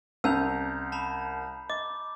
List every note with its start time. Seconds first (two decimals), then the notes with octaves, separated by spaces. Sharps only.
0.24 C2 C#4 A#5 E6 G6 F7
0.92 A5 B5 F7
1.70 D#5 D6